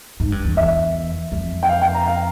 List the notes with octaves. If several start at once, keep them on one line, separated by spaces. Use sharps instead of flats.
G#2
G2
E2
E2 E5
F2
G5
F5
G5
A#5
F5